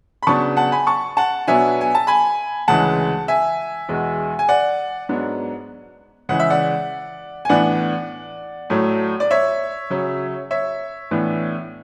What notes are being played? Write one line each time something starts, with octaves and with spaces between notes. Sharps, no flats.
B5
C#3 F#3 B3 D4 A5 C#6
F#5 A5
G#5 B5
A5 C#6
F#5 A5
B2 F#3 B3 D4 E5 G#5
G#5
A5
G#5 B5
D2 C#3 E3 G#3 F#5 A5
E5 G#5
E2 B2 G#3
G#5
D5 F#5
G#2 F#3 B3 D4
C#3 E3 G#3 F#5
E5
D5 F#5
G#5
A2 E3 B3 D4 D5 F#5
A2 F#3 A3
D5
C#5 E5
C#3 F#3 C#4
C#5 E5
A2 E3 B3 D4